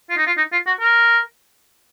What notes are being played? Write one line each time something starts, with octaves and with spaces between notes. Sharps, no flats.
F4
D#4
F4
D#4
F4
F#4
A#4